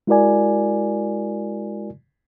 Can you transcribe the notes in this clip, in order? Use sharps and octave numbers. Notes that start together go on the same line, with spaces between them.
G#3 E4 F#4 A#4 D5 G#5